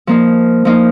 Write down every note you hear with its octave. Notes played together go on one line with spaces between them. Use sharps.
F3 A#3 D#4
F3 A#3 D#4